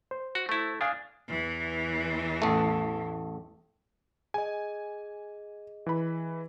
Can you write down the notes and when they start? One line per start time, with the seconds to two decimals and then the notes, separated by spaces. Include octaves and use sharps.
0.11 C5
0.35 F#4
0.49 A3 E4
0.81 D4 F5 G#5 D#6
1.28 E2 E3
2.42 A1 A3
4.34 G#4 D#5 G#5
5.86 E3 B5